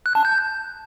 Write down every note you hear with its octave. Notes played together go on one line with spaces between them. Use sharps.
F#6
A5
G6